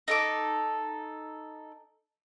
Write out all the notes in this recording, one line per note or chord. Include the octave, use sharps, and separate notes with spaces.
D#4 A4 D6